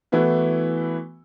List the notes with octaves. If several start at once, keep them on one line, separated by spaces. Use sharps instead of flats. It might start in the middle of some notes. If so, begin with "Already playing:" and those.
E3 A3 B3 E4 F#4